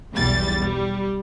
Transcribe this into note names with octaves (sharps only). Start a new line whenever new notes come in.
B1 E2 G3 A6
G3